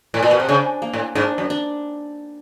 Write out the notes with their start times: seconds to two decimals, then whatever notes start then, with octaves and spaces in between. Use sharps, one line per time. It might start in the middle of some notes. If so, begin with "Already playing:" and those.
0.14 A2
0.23 A#2
0.31 B2
0.40 C3
0.49 C#3 D4
0.82 A#3
0.93 A2
1.15 G#2 D4
1.38 F#2
1.50 D4